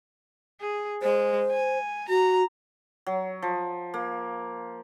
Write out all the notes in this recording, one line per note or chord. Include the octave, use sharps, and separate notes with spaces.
G#4
G#3 C5
G#5
F#4 A#5
F#3
F3
A#3